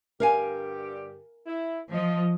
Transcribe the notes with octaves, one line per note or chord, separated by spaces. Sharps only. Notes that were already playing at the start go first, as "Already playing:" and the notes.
G2 D3 G4 A#4 F5 G#5
E4
F3 D#5